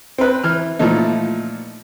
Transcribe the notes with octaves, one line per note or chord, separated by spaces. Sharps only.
C4 B4
E3 F6
A#2 E3 F3 A3 D#4